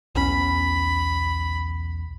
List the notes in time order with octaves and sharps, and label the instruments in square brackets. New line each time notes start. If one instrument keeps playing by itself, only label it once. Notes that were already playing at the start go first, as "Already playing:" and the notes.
[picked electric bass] B1 E2 C#4 [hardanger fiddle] B5